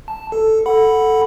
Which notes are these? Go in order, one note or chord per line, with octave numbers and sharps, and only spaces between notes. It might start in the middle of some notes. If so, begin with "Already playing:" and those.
A5
A4
A4 F#5 B5